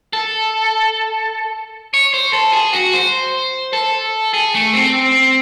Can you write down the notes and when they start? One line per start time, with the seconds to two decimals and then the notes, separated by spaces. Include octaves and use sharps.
0.13 A4
1.94 C#5
2.14 C5
2.33 A4
2.53 G#4
2.73 F#4
2.94 C5
3.73 A4
4.34 G#4
4.54 A3
4.73 C4